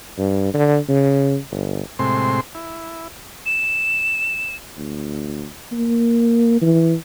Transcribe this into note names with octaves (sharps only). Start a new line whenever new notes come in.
G2
D3
C#3
G1
A2 C3 G#3 C4 C6
E4
E7
D2
A#3
E3